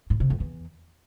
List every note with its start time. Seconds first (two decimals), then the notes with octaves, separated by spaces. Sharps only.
0.10 A2
0.20 C3
0.30 F2
0.40 E2